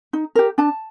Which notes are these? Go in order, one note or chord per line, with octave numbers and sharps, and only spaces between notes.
D#4
G4 A#4
D4 A5